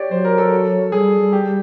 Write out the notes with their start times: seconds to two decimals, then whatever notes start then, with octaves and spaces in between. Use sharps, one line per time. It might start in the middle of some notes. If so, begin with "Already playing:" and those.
Already playing: G4 C#5 D5
0.11 F#3 C5
0.25 A#4
0.38 A4
0.92 G3 G#4
1.33 G4